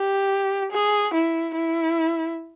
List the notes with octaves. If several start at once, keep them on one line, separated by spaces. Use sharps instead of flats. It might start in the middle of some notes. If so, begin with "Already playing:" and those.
Already playing: G4
G#4
E4
E4